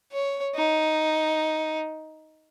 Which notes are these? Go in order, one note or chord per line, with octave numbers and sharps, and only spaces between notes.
C#5
D#4